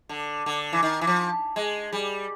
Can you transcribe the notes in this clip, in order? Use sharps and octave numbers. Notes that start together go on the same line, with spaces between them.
D3
D3
E3
D#3
E3
F3
G#3
G3